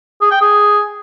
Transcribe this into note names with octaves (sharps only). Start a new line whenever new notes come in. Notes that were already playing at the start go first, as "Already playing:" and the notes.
G#4
G5
G#4